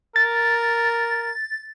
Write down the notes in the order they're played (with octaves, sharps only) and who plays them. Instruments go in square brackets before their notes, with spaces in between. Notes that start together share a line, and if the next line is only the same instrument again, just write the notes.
[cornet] A#4 [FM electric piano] A6